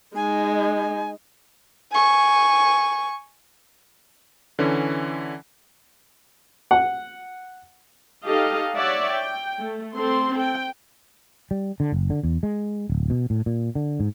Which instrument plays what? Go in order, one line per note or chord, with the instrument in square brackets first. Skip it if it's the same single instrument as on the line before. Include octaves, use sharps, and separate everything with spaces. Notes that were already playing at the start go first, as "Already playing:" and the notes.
[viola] G#3 D#4 [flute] G#5
[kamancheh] G#5 C#6
[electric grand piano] D3 E3 C#4
[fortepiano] F#5
[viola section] D#4 G4 A4 D#5 F5
C#5 D5 E5 F#5
G5
A3
C4 A4 C6
G5
[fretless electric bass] G3
D3
F#1
D3
E2
G#3
D1
B2
A2
A#2
D3
G#2